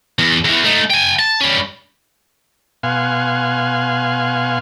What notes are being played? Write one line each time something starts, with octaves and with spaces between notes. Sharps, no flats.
E2
E2 E3
A3 D#4
G5 G#5
A5
G3 C#4
B2 F5 F#5 G#5 C6